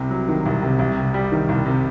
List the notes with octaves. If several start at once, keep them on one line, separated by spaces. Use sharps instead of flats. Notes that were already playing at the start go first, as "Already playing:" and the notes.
Already playing: C2 C3
F#3
D#3
C2
C3
C2
C3
G3
D#3
C2
C3